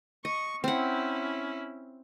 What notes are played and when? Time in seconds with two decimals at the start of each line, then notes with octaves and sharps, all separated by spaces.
0.25 D#5 C#6
0.64 C4 C#4 E4 F#5